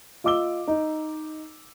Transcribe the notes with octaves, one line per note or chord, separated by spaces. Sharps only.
F4 D#5 D6 E6 G7
D#4